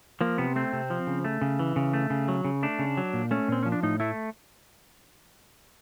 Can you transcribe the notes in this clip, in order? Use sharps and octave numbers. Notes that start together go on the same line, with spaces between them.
F3 A#3
C3 B3
A3 C4
C3
F3
C#3
A3
C#3
E3
C#3
A3
C#3
F#3
C#3
A3 D4
C#3
F#3
A#2
A3 C#4
A#2 C4
F3 C#4
D4
A2 D#4
A3 E4